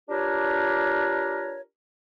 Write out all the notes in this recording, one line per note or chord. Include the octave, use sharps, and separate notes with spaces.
D4 F4 G4 A#4 B4 C#5